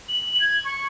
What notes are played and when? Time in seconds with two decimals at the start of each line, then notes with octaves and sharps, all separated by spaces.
0.09 F#7
0.40 G#6
0.65 C#6